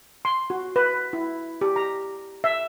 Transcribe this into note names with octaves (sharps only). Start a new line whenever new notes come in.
C6
F#4
B4
E4
G4
A#5
E5